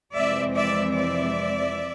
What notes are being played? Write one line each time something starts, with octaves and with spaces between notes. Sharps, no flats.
F2 C3 E3 G#3 C4 D5 E5
D5 E5
D5 E5